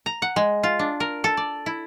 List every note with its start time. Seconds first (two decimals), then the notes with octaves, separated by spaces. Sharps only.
0.06 A#5
0.22 F#5
0.36 G#3
0.63 F4
0.79 D4
1.00 A#4
1.24 A4
1.37 D5
1.66 E4